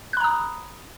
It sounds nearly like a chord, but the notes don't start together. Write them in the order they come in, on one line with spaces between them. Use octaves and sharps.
F#6 B5 A#5 D#6